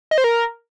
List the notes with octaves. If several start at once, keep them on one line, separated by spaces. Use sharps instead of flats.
D#5
C5
A#4